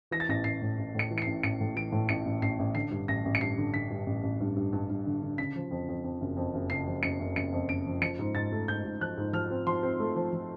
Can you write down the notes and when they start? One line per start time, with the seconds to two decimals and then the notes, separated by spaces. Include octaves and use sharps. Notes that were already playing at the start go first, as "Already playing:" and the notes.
0.11 E3 A#6
0.20 A6
0.28 A1 A#6
0.44 A1 C7
0.62 A2
0.78 A1
0.95 A2 C#7
1.11 E3
1.18 C#7
1.22 A1 C7
1.43 A1 C#7
1.61 A2
1.76 E3 D7
1.92 A2
2.09 A1 C#7
2.25 A1
2.42 A1 C7
2.59 A1
2.75 D3 C7
2.91 G2
3.08 A1 A#6
3.25 A1
3.35 C#7
3.41 G2 C7
3.58 D3
3.74 D3 B6
3.90 G2
4.06 A1
4.23 A1
4.40 G2
4.56 G2
4.73 G2
4.90 G2
5.06 D3
5.23 D3
5.38 C#3 B6
5.56 F3
5.71 F2
5.89 F2
6.04 F2
6.21 F#1
6.37 F2
6.54 F#1
6.70 C#3 C7
6.87 F3
7.03 F#1 C#7
7.20 F#1
7.36 F#1 C#7
7.53 F2
7.69 F#1 D7
7.86 F3
8.02 F3 C#7
8.19 G#2
8.35 G#2 A6
8.52 A3
8.68 G#2 G6
8.84 G#2
9.01 F3 F#6
9.18 G#2
9.33 F3 F6
9.50 C4
9.67 F3 C6
9.83 C4
10.00 A3
10.16 F3
10.33 F3